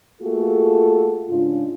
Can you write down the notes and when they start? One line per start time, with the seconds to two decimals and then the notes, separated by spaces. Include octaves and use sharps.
0.22 A3 A#3 F4 F#4 G#4 A4
1.28 G#2 C#3 D4 F4